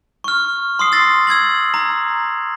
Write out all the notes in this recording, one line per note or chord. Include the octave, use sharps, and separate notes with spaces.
C#6 F6
C6 D#6 C7
E6 A6 A#6
E6 G#6 A6 F#7
A#5